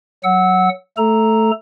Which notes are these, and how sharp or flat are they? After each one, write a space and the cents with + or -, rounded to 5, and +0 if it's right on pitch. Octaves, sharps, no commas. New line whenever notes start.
F#3 +0 F#5 +0 E6 -20
A3 +0 A4 +0 A#5 +0